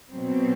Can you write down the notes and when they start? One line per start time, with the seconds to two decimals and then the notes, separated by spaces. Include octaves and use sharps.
0.10 B2 F#3 C4